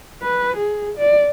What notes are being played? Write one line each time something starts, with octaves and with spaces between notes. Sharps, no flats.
B4
G#4
D5